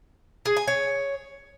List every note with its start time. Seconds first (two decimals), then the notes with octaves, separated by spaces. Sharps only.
0.46 G#4
0.57 G#5
0.67 C#5